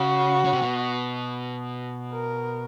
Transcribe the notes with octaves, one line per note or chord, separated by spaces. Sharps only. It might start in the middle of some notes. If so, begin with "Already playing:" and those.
Already playing: C#3 F#4
C#3
C3
B2
A#4